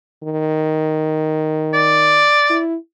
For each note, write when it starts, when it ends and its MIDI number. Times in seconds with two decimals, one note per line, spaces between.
0.23 2.28 51
1.73 2.58 74
2.50 2.76 64